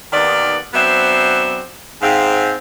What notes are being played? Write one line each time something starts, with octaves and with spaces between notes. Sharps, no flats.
D#2 D#3 B3 D5
F#3 B3 C4 D4 C5 E5
G#2 C4 F5